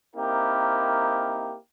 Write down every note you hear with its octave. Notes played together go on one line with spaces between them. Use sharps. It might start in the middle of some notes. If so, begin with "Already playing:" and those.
A#3 C4 D#4 E4 G4 A#4